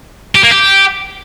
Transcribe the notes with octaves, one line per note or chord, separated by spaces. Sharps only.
G4
A#3
G4